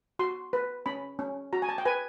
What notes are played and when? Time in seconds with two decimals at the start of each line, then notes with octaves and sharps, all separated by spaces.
0.19 F#4 C6
0.53 B4
0.86 C#4 B5
1.19 C#4
1.53 F#4 A#5
1.62 G#5
1.69 A5
1.78 G5
1.85 B4 G#5